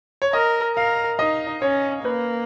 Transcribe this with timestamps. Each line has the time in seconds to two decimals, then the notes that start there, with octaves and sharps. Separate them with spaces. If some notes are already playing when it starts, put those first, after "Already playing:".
0.22 C#5
0.33 A#4 D#5
0.76 A#4 F5
1.19 D#4 D#5
1.62 C#4 C#5
2.04 A#3 B4